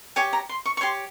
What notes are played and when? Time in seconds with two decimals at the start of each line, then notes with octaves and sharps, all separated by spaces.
0.16 G4 C#5 G#5
0.33 A#5
0.49 C6
0.65 C#6
0.77 C#6
0.81 G4 C#5 C6